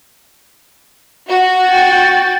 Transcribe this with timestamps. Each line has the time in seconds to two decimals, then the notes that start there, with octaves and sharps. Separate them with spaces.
1.29 F#4
1.67 G5 A6